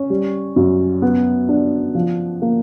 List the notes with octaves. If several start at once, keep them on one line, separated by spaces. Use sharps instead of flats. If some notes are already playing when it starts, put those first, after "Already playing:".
Already playing: C#4
G3
F#2
B3
D4
F3
A#3